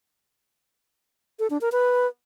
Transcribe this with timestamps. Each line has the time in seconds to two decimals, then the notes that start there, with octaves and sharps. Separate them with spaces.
1.39 A4
1.50 D4
1.61 A#4
1.72 B4